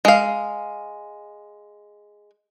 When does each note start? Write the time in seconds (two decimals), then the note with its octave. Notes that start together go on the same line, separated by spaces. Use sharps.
0.05 G#3 F5